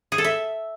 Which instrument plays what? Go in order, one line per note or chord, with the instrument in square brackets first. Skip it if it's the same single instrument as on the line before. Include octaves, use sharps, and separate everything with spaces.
[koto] G#4
A4
E5